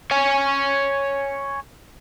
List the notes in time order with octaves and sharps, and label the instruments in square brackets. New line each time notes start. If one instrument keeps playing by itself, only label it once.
[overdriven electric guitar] C#5 G#5